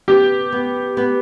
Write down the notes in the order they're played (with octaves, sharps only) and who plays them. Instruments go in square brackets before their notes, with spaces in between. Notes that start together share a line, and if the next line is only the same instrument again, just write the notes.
[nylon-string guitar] B3 [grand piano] G4
[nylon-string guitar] B3
B3